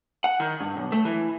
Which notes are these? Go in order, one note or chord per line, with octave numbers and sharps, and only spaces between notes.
F#5
D#3
G2
B1
A3
E3